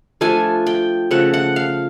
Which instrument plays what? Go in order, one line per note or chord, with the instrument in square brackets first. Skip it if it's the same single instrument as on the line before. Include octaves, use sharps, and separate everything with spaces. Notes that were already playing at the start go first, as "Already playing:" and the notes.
[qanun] F3 A3 D4 F4 G#5
G5
C#3 F3 A3 F#5
F#5
F5